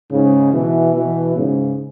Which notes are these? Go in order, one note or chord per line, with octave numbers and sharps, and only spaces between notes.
G#2 C#3
B2 E3
B2 E3
G#2 C#3